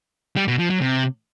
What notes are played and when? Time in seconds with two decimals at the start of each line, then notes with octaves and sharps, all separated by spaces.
0.36 G3
0.48 B2
0.59 F3
0.70 F#3
0.81 C3